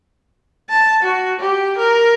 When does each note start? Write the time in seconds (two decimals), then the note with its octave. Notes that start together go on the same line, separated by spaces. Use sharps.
0.70 A5
1.03 F#4
1.40 G4
1.78 A#4